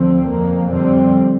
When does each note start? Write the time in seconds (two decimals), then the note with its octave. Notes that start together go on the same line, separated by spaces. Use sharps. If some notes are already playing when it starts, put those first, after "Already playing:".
Already playing: D2 D3 F3 C4
0.29 F2 F3 A#3
0.70 F2 D3 G3 C4